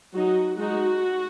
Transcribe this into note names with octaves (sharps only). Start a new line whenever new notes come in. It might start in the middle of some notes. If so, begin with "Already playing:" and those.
F#3 D#4 F#4
G#3 D#4 F#4